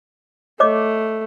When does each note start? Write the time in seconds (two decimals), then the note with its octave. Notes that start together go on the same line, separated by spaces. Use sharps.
0.60 A3 C#5 D#5 D6